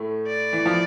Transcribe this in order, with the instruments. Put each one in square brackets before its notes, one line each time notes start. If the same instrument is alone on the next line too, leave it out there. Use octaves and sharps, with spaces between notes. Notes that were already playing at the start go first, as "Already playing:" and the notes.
Already playing: [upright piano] A2 A3
[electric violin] D5
[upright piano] E3
F3